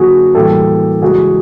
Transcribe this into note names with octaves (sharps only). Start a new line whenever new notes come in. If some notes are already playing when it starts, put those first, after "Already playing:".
Already playing: D3 F#3 A#3 F#4 G#4
A2 E3 G3 A#3 G4 A4
C#3 E3 G#3 F#4 G#4